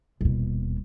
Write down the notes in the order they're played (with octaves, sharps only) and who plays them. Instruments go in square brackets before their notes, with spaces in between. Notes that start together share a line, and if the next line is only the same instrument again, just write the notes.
[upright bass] D#1 B2